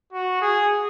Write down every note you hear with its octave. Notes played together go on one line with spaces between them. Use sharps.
F#4
G#4